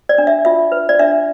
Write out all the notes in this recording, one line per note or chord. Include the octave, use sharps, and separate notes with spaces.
D5
D4
E5
F4 E5
B4
D5
D4 E5